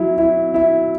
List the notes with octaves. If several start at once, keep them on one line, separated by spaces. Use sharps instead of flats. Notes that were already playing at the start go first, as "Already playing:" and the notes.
Already playing: F#3 E4
E4
E4